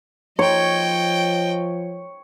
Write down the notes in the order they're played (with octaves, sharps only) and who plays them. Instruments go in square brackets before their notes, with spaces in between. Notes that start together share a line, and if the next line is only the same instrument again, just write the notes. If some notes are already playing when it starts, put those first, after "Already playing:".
[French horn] F3 [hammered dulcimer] C#5 [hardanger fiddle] D#5 G5